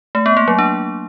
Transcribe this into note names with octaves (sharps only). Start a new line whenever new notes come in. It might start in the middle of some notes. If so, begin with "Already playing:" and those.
A3
B3
A#3
F#3
D4